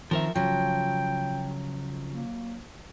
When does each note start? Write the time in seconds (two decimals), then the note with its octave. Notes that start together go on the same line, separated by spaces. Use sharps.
0.11 D#3 F3 C4 A#4 E5
0.36 C#3 F3 F#3 G5
2.11 A#3